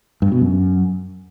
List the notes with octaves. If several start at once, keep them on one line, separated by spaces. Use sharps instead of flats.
G2
B2
F#2